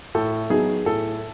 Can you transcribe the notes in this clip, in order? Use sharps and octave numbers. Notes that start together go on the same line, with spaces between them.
A2 A4
F#3 B3 D#4 G#4
A2 A4